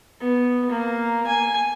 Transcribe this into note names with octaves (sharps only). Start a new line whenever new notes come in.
B3
A#3
G#5